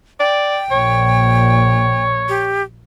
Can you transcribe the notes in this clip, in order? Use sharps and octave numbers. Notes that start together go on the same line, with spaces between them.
D5 G5
A#1 A#2 C#5
G4